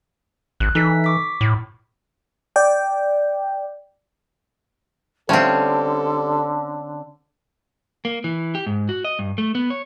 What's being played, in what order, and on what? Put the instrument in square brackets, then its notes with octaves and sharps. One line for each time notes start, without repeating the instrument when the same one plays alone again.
[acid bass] G#1 [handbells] F#6
[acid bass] E3 [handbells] D#4 A4 B6
[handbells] C#6 D6 B6
[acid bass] A2
[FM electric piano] D5 G5
[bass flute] D3 [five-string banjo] G3 A3 F4 [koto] C4 C#4 [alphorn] A4
[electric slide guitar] A#3
E3
G4
G#2
F#4
D#5
G2
A3
B3
C#5